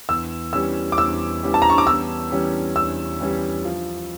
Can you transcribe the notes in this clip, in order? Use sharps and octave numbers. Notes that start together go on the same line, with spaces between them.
E2 E6
E3 G3 C#4 G4 E6
D6
E2 E6
E3 G3 C#4 G4
A5
A#5
C#6
D6
E2 E6
E3 G3 C#4 G4
E2 E6
E3 G3 C#4 G4
F3